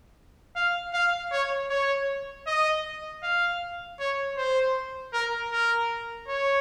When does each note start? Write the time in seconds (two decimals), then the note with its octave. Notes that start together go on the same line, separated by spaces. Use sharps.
0.56 F5
0.94 F5
1.32 C#5
1.70 C#5
2.47 D#5
3.23 F5
4.00 C#5
4.37 C5
5.13 A#4
5.51 A#4
6.28 C#5